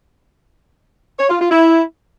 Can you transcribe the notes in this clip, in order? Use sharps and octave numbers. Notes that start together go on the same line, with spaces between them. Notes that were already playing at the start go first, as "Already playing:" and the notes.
C#5
F4
F4
E4